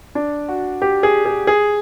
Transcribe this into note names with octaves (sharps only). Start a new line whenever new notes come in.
D4
F#4
G4
G#4
G#4
G#4